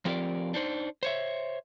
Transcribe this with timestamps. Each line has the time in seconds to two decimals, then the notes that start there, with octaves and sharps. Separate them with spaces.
0.05 F3 C4 F4 G4 A#4 D5
0.54 D4 D#4 C5
1.03 C5 C#5 E5